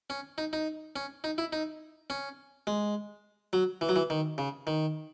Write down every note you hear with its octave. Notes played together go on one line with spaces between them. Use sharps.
C#4
D#4
D#4
C#4
D#4
E4
D#4
C#4
G#3
F#3
E3
F#3
E3
D#3
C#3
D#3